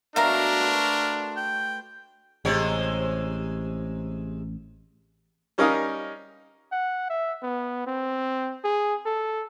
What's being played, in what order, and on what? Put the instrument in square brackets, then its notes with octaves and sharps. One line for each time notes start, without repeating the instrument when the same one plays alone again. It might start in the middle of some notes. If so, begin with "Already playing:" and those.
[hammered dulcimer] B2 A3 B3 [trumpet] D4 [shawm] A#4 [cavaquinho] E5 F5 A#5
[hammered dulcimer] F#4 B4 C5
[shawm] G5
[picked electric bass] A1 [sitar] C3 G#3 C#5
[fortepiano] G3 C#4 D#4 A#4 F5 D#6
[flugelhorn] F#5
E5
B3
C4
G#4
A4